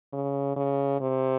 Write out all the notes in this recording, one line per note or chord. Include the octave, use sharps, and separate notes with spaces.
C#3
C#3
C3